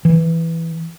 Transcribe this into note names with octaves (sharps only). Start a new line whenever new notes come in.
E3